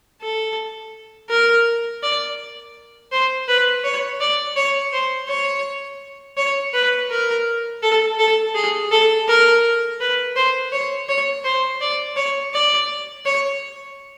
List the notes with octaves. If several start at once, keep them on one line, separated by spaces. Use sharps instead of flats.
A4
A#4
D5
C5
B4
C#5
D5
C#5
C5
C#5
C#5
B4
A#4
A4
A4
G#4
A4
A#4
B4
C5
C#5
C#5
C5
D5
C#5
D5
C#5